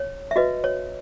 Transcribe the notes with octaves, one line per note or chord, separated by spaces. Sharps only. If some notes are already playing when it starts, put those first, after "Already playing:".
Already playing: C#5
E5
F#4 B4 D#5
C#5